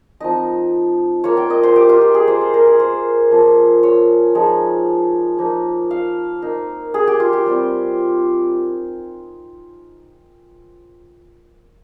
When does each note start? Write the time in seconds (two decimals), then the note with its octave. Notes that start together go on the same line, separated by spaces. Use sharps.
0.20 F3 C4 D#4 D#5
1.24 A#3 F4 C#5
1.37 G5
1.50 D#5
1.63 C5
1.76 G4
1.89 F4
2.02 G4
2.14 G#4
2.28 A#3 F4 C5
2.41 C5
2.54 A#4
2.66 G#4
2.80 C5
3.31 F3 A#3 C#4 F4
3.83 C#5
4.35 F3 G#3 D#4
5.38 F3 A#3 D#4
5.91 F5
6.42 A#3 D#4
6.94 G#4
7.07 G4
7.20 F4
7.33 G4
7.46 G3 C4 F4